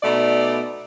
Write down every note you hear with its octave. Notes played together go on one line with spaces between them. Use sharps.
B2 A3 D#4 D5